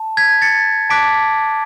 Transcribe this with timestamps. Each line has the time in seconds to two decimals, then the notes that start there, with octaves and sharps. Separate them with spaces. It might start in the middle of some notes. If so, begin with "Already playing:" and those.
Already playing: A5
0.17 G#6 B6
0.42 A6 C#7
0.90 A5 D6 F#6 B6 D7